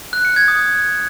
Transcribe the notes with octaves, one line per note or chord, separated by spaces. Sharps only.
F#6
C#7
G#6
D#6